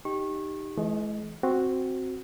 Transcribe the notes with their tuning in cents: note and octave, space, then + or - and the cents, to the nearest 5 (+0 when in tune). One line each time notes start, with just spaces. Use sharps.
D#4 +0 G4 +0 C#6 -30
E3 +0 G#3 +45 D#5 +0
C4 +0 F#4 +0